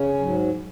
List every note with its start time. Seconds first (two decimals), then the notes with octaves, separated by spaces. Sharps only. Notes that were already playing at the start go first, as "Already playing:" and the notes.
Already playing: C#3 C#4
0.19 G#2 F#3